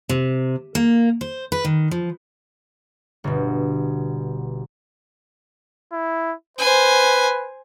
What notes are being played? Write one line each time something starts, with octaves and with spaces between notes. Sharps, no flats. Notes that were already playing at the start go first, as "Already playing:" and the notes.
C3
A#3
C5
B4
D#3
F3
G1 B2
E4
B4 C5 G#5